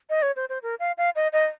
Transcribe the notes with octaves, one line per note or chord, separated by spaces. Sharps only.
D#5
C#5
C5
C5
A#4
F5
F5
D#5
D#5